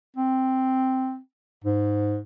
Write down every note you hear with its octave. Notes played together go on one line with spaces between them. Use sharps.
C4
G#2